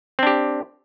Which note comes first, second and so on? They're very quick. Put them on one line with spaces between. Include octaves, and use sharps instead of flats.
C4 D4 G4